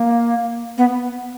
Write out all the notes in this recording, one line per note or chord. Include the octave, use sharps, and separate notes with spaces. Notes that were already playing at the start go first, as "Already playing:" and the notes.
Already playing: A#3
B3